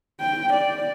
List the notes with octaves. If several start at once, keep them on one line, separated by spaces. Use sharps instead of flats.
G5
D5